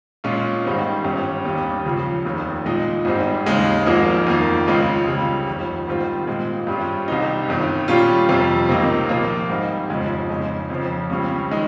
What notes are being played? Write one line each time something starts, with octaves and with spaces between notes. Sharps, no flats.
A#2 G#3 C#4 F4
G#2 D#3 G3 C4 D#4
G1 G2 G3 C#4
D#2 D#3 G3 C#4
C#2 C#3 F3
F1 D#2 D#3
A#2 G#3 D#4
G#1 G#2 G3 C4 D#4
D#2 C#3 G#3 D#4
G#1 G#2 F3 A#3 D#4
F2 D#3 A#3
C#2 C#3 G#3 C4 F4
C#2 C#3 G3
G1 F2 D#3
G#2 D#3 G3 C4 F4
A#2 G#3 C4
G2 G3 C#4 F4
C2 C3 G3 C4 D#4
G1 G2 D#3
A#2 G3 C#4 F4
F2 C3 G3
C#2 C3 D#3 A#3 D#4
A#2 F3 A#3 F4
G#2 G3 C4 D#4
G1 F2 C#3 G#3
F2 C#3 G#3 D#4
F2 C#3 F3 C4
C#2 C#3 G3 C#4
D#3 G#3 D#4